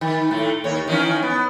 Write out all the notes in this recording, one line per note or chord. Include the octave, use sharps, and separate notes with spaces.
D#3
A2 A3
D#2 C#5
D#3 E3 C#4
B3